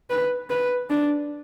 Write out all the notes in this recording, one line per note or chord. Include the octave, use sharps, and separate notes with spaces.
B4
B4
D4